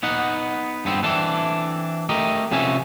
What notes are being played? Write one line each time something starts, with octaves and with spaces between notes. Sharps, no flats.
B3 D#4 F#5
G2 B3 C4
E3 C4 D4 A4
A3 G4 A#4 D#5
C3 F3 C#4 E5 G#5